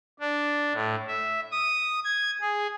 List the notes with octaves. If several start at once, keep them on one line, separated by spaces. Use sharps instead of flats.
D4
A2
E5
D#6
G#6
G#4